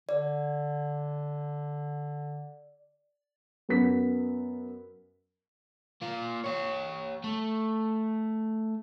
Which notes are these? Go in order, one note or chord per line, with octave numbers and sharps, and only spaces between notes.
D3 D5
F#2 B3 B6
A#3 F4
G4 C#5
A3